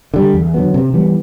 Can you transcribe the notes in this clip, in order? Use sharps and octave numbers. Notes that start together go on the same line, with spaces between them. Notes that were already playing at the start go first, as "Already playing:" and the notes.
D3 G3
E2
D3 F#3 B3
C3
E3 G3 B3